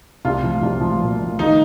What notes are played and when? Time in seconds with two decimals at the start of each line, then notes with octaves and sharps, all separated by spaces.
0.25 C2 F4
0.43 F3
0.62 C2
0.81 F3
1.00 A#2
1.20 F3
1.39 D#3 D#4